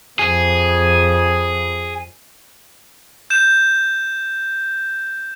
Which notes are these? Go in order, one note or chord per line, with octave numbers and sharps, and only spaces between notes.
F2 G#4
G6 E7